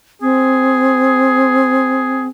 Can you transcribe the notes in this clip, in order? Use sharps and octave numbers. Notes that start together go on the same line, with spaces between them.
C4 G#4